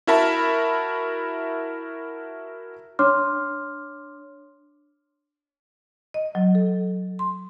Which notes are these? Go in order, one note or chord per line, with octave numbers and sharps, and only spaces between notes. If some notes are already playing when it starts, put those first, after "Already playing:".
E4 F#4 A#4 E5 A5 B5
D4 C#5 C6 D6 F6
D#5
F#3
A4
C6